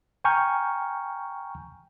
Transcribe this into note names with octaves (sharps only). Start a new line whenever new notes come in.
G5 G#5 A#5 C#6 F6 G6